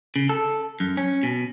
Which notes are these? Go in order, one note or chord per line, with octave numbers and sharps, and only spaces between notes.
C#3
A4
F#2
C#4
B2